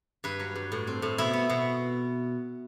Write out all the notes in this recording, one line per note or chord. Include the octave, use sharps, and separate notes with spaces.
G2 B4
F#3
G2
A2
C4
A2
B2 E4
B3
B2